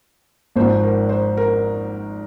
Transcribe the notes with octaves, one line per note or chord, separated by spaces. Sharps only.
G#1 G#2 F3 C5
A#4
C5
A#4